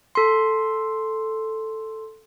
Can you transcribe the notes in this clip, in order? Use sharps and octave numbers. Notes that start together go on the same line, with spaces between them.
A4 C6